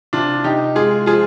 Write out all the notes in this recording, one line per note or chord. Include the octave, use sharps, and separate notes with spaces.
C3 D4 F4
C3 D#4 G4
G#3 F4 G#4
F3 F4 G#4